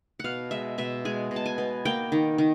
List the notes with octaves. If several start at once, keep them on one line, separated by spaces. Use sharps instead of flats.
B2 F5 F#5
G#3 E5
B2 E5
G#3 G#5
B2
A5
G#5
B3
A#3 G5
D#3
D#3